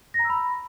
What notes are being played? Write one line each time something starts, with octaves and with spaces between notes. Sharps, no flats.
A#6
A#5
E6
B5